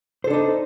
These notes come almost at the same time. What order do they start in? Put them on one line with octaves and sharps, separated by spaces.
C5 A4 D4 D#4